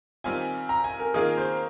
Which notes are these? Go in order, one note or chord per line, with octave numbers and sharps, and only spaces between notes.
D#3 G3 C4 F4 G#5
A#5
G#5
A#4
D#3 A#3 F4 G#4 A#4
C5